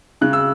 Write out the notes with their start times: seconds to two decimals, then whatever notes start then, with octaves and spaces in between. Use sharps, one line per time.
0.21 C#3 F#6
0.33 E6